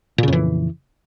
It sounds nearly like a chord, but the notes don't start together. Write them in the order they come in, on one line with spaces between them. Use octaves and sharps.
A#2 C#3 F2 E3